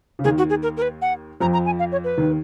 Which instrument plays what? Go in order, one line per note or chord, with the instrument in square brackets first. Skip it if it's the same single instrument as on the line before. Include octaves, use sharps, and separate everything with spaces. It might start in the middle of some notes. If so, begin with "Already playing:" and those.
[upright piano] C#3
[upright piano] D#2 D#3 [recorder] G#4
[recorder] F#4
G#4
A#4
A#4
B4
F#5
[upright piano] F2 F3 [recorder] A#5
[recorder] A#5
G#5
F5
C#5
B4
[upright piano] D#2 D#3